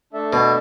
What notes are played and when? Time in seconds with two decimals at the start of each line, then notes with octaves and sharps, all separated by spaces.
0.13 A3 D4 A4 E5 A5
0.33 B2